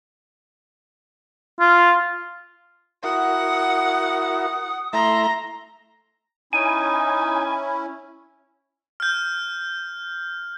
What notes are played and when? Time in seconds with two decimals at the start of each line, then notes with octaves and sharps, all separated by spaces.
1.60 F4
3.04 E4 F#4 A#4 F#5 D#6
4.93 A3 E4 E5 A#5 C6
6.53 C#4 D#4 E4 G#5
9.00 F6 G6